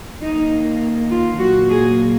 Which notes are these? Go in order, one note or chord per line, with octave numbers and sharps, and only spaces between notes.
D#3 A#3 D#4
F4
A#2 F#3 A#3 F#4
G#4